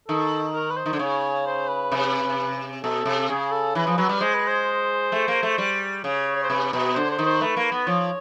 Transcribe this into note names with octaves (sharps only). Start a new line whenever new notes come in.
D#3 A4
A#4
B4
C5
D#3
D3
C#3 C#5
C5
B4
C3
B2 A4
C3
C#3 G#4
A4
E3 B4
F3
F#3 B4
G3
G#3 C5
B4
C5
A3
A#3
A3
G3
C#3 C#5
C#5
C5
C3 B4
B2 B4
D3 C5
C5
D#3
C5
A3 B4
A#3
B4
B3
F3 C#5